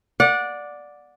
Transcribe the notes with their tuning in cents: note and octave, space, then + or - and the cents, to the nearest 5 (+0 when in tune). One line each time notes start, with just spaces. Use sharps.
D5 +0 F#5 -25